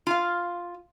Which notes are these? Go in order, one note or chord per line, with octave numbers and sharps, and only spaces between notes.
F4 F5